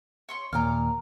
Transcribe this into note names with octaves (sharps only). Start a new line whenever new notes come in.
C#5 C6 C#6
D#2 A#2 A#5 D6 F6